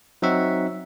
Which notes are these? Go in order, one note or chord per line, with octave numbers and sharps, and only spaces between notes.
F#3 C4 D#4 F#4 E5 F#5